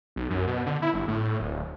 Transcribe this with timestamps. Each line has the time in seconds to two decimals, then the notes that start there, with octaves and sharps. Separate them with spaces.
0.16 B1
0.30 F#2
0.47 B2
0.66 D3
0.82 E4
0.94 G1
1.08 A2
1.40 D1